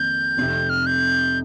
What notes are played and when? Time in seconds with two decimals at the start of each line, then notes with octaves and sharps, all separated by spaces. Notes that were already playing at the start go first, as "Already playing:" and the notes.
Already playing: F2 D#3 A#3 G6
0.37 F1 F2 C3
0.70 F6
0.86 G6